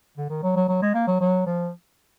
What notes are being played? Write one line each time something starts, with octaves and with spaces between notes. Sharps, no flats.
D3
D#3
F#3
F#3
F#3
G#3
A#3
F#3
F#3
F3